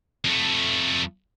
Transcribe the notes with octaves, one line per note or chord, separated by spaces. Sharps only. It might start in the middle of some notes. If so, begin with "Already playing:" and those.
F2 A3